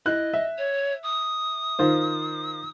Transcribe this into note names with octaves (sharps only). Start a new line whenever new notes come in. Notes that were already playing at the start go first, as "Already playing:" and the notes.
E4 D#5 F#6
E5
C#5
D#6
D#3 F4 C5